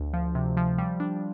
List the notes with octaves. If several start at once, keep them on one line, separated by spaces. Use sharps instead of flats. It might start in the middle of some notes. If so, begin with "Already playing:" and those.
Already playing: D2
F3
C3
F3
G3
D4